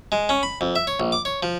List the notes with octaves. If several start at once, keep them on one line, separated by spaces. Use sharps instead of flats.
G#3
C#4
B5
F2
E5
C#5
A#1
D6
C#5
F3